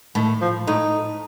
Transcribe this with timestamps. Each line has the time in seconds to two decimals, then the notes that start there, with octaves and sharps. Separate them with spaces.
0.15 A2 D#3
0.41 F3
0.67 A2 D#4